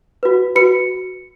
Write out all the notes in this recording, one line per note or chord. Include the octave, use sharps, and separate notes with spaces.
F#4 B4
F#4 B4 C#7